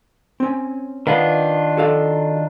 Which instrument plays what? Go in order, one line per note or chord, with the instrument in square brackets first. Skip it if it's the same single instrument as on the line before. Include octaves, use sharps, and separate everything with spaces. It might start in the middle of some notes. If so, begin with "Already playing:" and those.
[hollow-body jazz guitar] C4 C#4
[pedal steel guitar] D#3 D4 F4 [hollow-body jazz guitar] B4 F5 F#5
[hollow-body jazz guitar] F#4 A4 F5